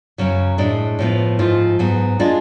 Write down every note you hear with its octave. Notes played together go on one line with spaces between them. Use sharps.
F#2 C#3 F#3
A2 G#3 D4
A2 F3 B3
G#2 F3 A3 F4
G#2 F#3 B3
G#3 D4 F4